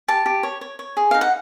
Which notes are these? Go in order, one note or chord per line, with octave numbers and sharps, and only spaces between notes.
G4 A5
G4
C#5
C#5
C#5
G#4
D#4 F5
F#5